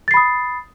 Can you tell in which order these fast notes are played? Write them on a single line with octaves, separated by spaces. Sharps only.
A6 C7 B5 D#6